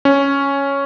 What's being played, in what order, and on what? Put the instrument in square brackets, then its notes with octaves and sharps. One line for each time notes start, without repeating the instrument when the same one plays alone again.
[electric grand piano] C#4